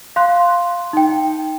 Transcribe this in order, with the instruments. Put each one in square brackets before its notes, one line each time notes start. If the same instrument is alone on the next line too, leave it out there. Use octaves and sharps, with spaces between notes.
[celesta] F5 C6 F#6
D#4 G5